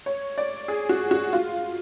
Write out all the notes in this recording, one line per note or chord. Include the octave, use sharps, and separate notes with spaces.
C#5
D5
G#4
F#4
F#4
F4